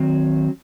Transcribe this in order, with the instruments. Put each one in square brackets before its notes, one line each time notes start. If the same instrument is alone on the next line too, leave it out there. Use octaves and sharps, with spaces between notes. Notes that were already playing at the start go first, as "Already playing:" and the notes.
Already playing: [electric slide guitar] D#3 F#3 C4